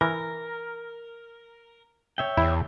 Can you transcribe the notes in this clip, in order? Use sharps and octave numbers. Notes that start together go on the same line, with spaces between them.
E3 A#4
C#5 E5 G5
E2 E4